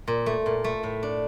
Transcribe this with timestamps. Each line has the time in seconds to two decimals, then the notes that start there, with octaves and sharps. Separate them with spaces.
0.08 A#2
0.26 A3
0.46 A#2
0.64 A3
0.83 A2
1.03 D4